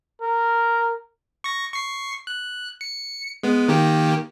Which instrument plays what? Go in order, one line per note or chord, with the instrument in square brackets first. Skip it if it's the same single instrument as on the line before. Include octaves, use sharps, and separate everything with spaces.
[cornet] A#4
[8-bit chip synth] C#6 A#6
C#6 C7
F#6
C#7
G#3 B3
D#3 A#3 G4